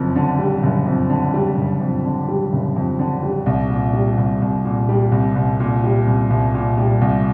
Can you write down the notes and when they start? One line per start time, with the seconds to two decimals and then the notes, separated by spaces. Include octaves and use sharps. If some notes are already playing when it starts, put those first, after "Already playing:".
Already playing: F#1 F2
0.16 D3
0.39 G3
0.63 F#1
0.86 F2
1.10 D3
1.34 G3
1.57 F#1
1.81 F2
2.05 D3
2.28 G3
2.53 F#1
2.76 F2
2.99 D3
3.23 G3
3.46 C2
3.70 A#2
3.93 G3
4.18 C2
4.42 C2
4.65 A#2
4.89 G3
5.12 C2
5.35 C2
5.60 A#2
5.84 G3
6.07 C2
6.30 C2
6.55 A#2
6.78 G3
7.01 C2